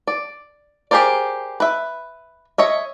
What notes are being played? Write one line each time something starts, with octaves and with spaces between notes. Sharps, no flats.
D5
G4 G#4 A#4 C5 D5
B4 E5
C#5 D#5 E5